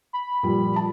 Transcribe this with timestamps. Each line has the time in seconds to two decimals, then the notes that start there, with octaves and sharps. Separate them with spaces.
0.13 B5
0.43 A#2 F3 G3
0.76 A5